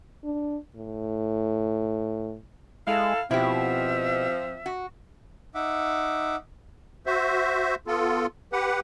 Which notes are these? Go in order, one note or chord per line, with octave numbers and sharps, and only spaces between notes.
D4
A2
G#3 E4 A4 F5
B2 F3 C4 E4 G4 E5
F#4
D#4 E5 F#5 D6
F#4 C5 E5
B3 F4 A4
G4 B4 F#5